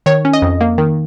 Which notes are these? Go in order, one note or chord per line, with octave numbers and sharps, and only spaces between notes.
D#3 C#5
C#4
D#5
F2
A#3
D#3